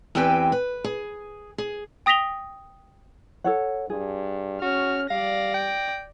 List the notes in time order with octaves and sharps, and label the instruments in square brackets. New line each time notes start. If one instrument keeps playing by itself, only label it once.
[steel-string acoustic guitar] E2 C4 G4 B4 G5 G#5
B4
G#4
G#4
[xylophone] G5 D#6 A#6 B6 F7 G7
[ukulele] A4 C#5 F#5
[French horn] G2 [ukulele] G#4
[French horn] C#4 [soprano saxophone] F#4 [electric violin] F6
[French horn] G3 [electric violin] D5 A#6 [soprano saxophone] F5
[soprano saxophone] G5